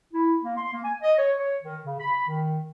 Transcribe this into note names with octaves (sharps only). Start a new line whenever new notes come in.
E4
A#3
C6
A#3
G#5
D#5
C#5
C#5
D#3
C#3
B5
D#3